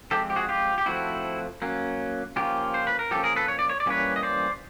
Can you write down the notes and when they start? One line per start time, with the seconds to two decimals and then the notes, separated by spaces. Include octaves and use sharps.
0.11 F3 G#3 C4 G4 A4
0.30 G4
0.36 F#4 G#4
0.49 F4 G4
0.78 G4
0.86 F3 A3 C4 E4 F#4
1.62 F#3 A#3 C#4
2.36 F3 A#3 C#4 F4 G4
2.74 C5
2.87 B4
2.99 A#4
3.11 F3 A#3 C#4 G4 A4
3.24 G#4 A#4
3.36 A4 B4
3.48 C#5
3.59 D5
3.69 C#5
3.80 D5
3.86 E3 G3 A#3 C#4 B4 C#5
4.16 D#5
4.23 C5 D5